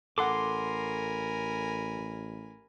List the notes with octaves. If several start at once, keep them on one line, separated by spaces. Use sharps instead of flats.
A1 A4 A#4 F#5 G#5 B5 C6 D6